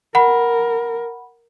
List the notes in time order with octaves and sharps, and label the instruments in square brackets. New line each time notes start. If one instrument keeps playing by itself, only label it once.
[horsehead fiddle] A#4 [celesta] F#5 B5